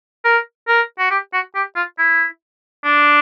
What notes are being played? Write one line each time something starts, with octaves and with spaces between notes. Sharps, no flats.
A#4
A#4
F#4
G4
F#4
G4
F4
E4
D4